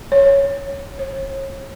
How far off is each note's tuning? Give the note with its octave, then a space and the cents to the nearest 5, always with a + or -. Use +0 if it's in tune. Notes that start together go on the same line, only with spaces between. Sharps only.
C#5 +0
C#5 -35